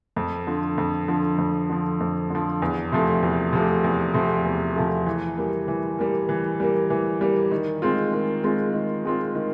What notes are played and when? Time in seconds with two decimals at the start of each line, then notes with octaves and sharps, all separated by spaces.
0.16 F2
0.47 D3 F3
0.78 F2
1.08 D3 F3
1.38 F2
1.69 D3 F3
2.00 F2
2.30 D3 F3
2.62 E2
2.92 C3 F3 A3
3.23 E2
3.53 C3 F3 A3
3.84 E2
4.14 C3 F3 A3
4.45 E2
4.76 C3 F3 A3
5.06 E3
5.37 G3 A#3
5.68 E3
5.99 G3 A#3
6.29 E3
6.60 G3 A#3
6.90 E3
7.21 G3 A#3
7.52 D#3
7.82 G#3 C4 F4
8.13 D#3
8.44 G#3 C4 F4
8.74 D#3
9.05 G#3 C4 F4
9.35 D#3